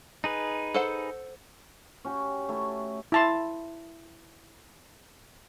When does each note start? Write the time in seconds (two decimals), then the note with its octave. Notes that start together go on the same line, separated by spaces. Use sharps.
0.24 D#4 G#4 B4
0.74 A4 C5 F#5
2.05 C#4 F#4 G4
2.49 A3 E4 E5
3.12 E4 A5 C6